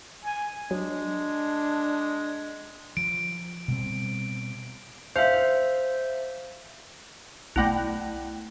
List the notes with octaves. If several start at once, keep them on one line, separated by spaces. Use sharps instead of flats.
G#5
F#3 G#3 D4
F3 D7
B2 G3 C4
C5 E5 F5
B1 A3 E4 F#5 G5